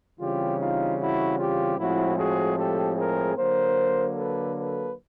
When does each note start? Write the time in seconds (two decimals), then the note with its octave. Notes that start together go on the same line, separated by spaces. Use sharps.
0.19 C#3 E3 G3 C4 F4 G4
0.59 D#4 F4
0.99 E4 F#4
1.38 F4 G4
1.78 A2 F3 G#3 C4 E4 F#4
2.17 F#4 G#4
2.57 G4 A4
2.97 G#4 A#4
3.36 D3 F#3 A#3 A#4 C5
4.17 A4 B4
4.56 A4 B4